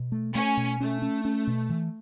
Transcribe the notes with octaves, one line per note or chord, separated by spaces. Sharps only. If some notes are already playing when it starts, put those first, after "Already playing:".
Already playing: B2
A3
A3 C#4
B2
A3 C#4
C#4
C#4
B2
E3